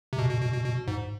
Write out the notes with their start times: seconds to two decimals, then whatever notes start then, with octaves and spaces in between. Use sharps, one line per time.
0.13 C3
0.18 B2
0.29 B2
0.41 B2
0.53 B2
0.64 B2
0.88 G#2